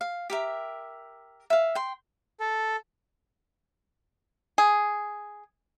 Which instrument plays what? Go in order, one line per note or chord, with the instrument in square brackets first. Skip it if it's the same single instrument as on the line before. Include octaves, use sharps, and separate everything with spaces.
[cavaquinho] F5
G4 A#4 E5
E5 F5
G5 C6
[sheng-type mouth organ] A4
[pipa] G#4